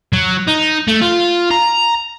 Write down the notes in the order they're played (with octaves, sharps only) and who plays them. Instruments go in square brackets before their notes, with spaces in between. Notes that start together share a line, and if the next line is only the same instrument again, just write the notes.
[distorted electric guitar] F#3
D#4
A3
F4
A#5